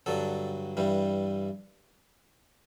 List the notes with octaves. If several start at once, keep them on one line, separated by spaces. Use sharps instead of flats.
G2 D3 F#3 A4
G2 E3 G3